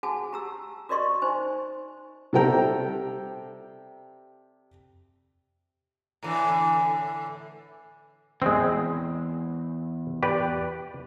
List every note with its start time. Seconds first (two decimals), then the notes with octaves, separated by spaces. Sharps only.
0.03 F#4 G#4 F#5 G#5 A5
0.33 G4 A#5 E6
0.89 F#4 A#4 D5 D#5 C6 C#6
1.22 D#4 C5 G#5
2.33 C3 G3 A4 C5 G5 A#5
6.23 A2 D3 E3
8.42 E2 G#3 C4
10.23 G4 B4 D5